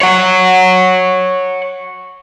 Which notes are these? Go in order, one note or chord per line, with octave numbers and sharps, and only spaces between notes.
C#5 F#5